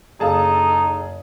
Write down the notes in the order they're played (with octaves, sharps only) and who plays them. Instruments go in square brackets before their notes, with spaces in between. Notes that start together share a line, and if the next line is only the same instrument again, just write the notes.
[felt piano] F#1 F5 D#6 [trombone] D#4 [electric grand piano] G#4 A5 [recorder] A4